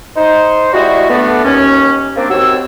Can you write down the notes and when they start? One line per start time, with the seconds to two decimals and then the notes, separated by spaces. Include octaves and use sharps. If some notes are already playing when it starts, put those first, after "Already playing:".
0.16 D#4 C5
0.73 G3 G#3 E4 F#4
1.10 A3 B3 D4
1.45 D#2 C#4
2.17 A#3 C4 D4
2.30 D#2 C4 F#4 C#5 E6